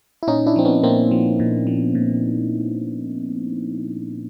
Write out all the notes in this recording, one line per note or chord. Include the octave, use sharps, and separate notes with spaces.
E4
A#2 C#4 D#4
D4 E4
F3 C4
B3 C#4
A#2 A#3 C4
F3
A#2
F3
A#2